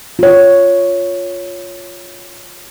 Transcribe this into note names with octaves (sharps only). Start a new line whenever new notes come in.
F4 C#5